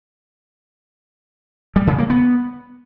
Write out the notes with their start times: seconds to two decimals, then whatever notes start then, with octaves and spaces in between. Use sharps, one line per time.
1.76 G3
1.87 C#3
1.98 A#3
2.10 B3